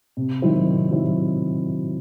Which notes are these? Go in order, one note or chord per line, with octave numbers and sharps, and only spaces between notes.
C3
D#3 F#3 C4 E4
C3
D#3 F#3 C4 E4